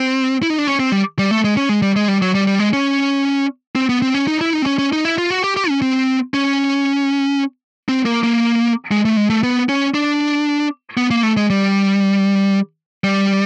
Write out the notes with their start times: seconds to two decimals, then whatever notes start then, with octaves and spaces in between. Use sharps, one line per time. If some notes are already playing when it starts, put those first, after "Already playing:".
Already playing: C4
0.42 E4
0.50 D#4
0.58 D4
0.67 C#4
0.80 C4
0.92 G3
1.19 G3
1.31 A3
1.44 G#3
1.57 C#4
1.69 G#3
1.82 G3
1.96 G#3
2.08 G3
2.22 F#3
2.35 G3
2.47 G3
2.59 G#3
2.73 C#4
3.75 C4
3.89 B3
4.02 C4
4.14 C#4
4.28 D#4
4.41 E4
4.53 D#4
4.62 C4
4.66 C#4
4.79 C#4
4.93 D#4
5.05 E4
5.18 F4
5.30 F#4
5.44 G4
5.57 G4
5.69 C#4
5.82 C4
6.34 C#4
7.89 C4
8.05 A#3
8.23 A#3
8.91 G#3
9.05 A3
9.17 G#3
9.30 A3
9.43 B3
9.69 C#4
9.94 D4
10.97 B3
11.11 A#3
11.23 A3
11.37 G#3
11.50 G3
13.04 G3